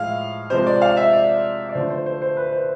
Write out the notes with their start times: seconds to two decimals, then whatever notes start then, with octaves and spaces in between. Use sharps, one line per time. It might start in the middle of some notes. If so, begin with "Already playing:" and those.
Already playing: A2 F3 G#3 F5
0.50 C3 F3 G#3 C5
0.67 D5
0.82 F5
0.97 E5
1.13 D5
1.69 D5
1.75 D3 F3 A3 C5
1.90 C5
2.06 C5
2.22 C5
2.37 B4
2.52 C5